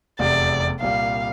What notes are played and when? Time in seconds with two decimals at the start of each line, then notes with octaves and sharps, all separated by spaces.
0.19 F1 E2 C3 D5
0.81 C2 A#2 G3 F5